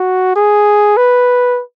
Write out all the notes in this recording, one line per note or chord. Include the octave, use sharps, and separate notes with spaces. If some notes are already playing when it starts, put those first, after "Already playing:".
Already playing: F#4
G#4
B4